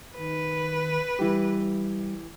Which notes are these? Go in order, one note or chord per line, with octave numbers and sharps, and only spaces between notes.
D#3 B4
E3 G3 G4